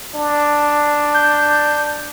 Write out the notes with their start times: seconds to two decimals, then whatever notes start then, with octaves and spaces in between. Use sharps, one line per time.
0.15 D4
1.14 G6